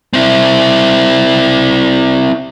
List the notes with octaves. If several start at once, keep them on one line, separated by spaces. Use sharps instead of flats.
C4 E4